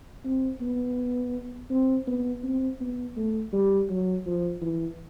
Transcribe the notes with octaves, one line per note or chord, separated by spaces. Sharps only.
C4
B3
C4
B3
C4
B3
A3
G3
F#3
F3
E3